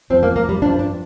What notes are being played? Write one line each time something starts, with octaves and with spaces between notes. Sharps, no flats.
F2 F3 C4
A#3
A#3
G3
G2 F3 D4
D4